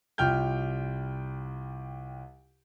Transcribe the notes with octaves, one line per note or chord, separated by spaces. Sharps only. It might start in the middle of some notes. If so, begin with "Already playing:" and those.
C2 F4 G5 F6 G6